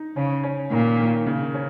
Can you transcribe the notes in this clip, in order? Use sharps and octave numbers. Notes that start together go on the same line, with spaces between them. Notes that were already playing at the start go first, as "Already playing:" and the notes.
Already playing: D#4
C#3 C#4
C#4
A#2 D#3
D#3
C#3
C#4